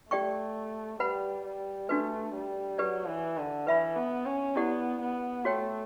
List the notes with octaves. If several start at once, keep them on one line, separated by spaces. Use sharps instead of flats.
A3 G4 D5 G5 C#6
G3 B4 F#5 B5
G3
A3 D4 F#4 B4
G3
F#3 G4 B4 D5
E3
D3
E3 B4 E5 B5
B3
C#4
B3 E4 G4 D5 F#5
B3
A3 F#4 C#5 G5